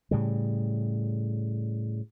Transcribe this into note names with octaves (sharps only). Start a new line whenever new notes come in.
A2 C#3 G3